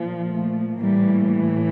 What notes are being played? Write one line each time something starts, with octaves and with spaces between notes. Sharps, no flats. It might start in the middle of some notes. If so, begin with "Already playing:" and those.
Already playing: A#2 F3
A3
A2 E3 G3 A#3